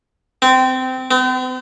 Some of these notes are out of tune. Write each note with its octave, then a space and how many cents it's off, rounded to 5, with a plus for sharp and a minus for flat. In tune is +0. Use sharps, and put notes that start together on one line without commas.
C4 -20
C4 -45